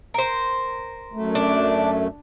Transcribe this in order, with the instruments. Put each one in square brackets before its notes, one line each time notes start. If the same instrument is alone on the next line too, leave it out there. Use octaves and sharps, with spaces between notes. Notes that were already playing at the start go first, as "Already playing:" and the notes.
[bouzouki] A#4 C5
[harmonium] F#2 A3
[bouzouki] D4